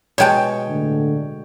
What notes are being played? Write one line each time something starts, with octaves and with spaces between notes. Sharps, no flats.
B2 G#3 C#5 G5 A5
A2 D3